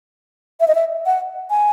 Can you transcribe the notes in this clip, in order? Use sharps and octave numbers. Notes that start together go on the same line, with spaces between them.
E5
D#5
E5
F#5
G#5